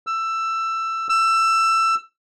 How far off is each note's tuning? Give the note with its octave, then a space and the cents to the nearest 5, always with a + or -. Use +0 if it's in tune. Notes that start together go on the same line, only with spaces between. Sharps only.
E6 +15
E6 +20